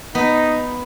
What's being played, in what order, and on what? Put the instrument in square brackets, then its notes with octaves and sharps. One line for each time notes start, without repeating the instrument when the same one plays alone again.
[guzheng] B3 [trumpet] D#4